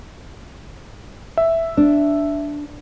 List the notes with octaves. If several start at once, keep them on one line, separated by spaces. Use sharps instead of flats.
E5
D4